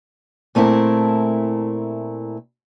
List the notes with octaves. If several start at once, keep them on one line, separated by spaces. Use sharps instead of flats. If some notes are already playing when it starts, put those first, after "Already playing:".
A#2 A3 C4 E4 A#4